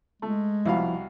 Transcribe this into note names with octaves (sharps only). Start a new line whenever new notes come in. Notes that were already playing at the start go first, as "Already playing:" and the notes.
G#3 A3
C2 B2 F3 E4 F5